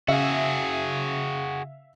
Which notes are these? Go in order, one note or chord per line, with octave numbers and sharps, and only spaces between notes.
C#3 F#4 G#4 E5 F5